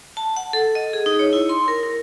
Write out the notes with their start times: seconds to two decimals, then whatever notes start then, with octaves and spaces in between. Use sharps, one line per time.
0.17 A5
0.37 F#5
0.53 A4
0.75 D#5
0.93 G#4
1.06 D#4
1.19 C#5
1.33 E4
1.49 C6
1.68 A#4
1.83 A#4